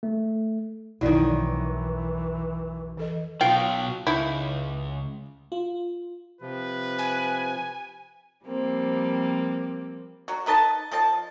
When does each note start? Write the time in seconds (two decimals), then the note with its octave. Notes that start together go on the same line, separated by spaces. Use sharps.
0.03 A3
1.01 B1 F2 D#3 E3 F#3 E4 D5
2.97 E3 A4 D#5
3.41 B2 F#3 F4 F5 G5
4.07 C#2 D#4 E4
5.52 F4
6.41 C3 F3 B4
6.98 G#5
8.45 F3 G3 A#3 C4
10.28 F#3 F#4
10.46 D#4 B4 D#5 A5
10.92 F3 D#5 A5